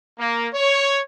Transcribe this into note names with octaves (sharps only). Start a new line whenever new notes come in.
A#3
C#5